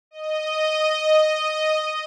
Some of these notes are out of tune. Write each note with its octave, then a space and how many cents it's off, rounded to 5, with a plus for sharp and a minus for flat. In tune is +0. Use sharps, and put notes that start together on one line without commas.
D#5 -5